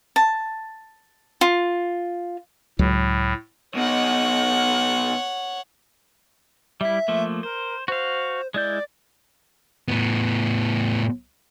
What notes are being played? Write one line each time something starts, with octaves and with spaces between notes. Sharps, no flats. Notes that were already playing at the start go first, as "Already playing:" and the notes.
A5
F4
C#2 A2 F#3
B2 D#4 C#5 F#5
G3 E4 E5
F3 A3 A#3
A#4 C5
F#4 C5 F5
G#3 E4 D5 G6
A2 B3